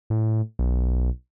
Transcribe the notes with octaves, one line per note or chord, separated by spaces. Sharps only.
A2
B1